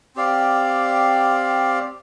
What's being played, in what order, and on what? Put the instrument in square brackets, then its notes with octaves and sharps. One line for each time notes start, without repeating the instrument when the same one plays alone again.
[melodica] C4 G4 D5 F5